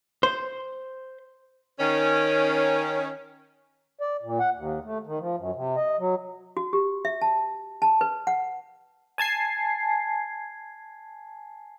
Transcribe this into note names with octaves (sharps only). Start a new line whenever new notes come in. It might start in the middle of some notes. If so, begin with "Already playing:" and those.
C5
D#3 C#4
D5
A#2
F#5
D#2
A3
D#3
F3
F#2
C3
D#5
F#3
F#4
G4
E5
A5
A5
B4
F#5
G#5 A5 G#6 C7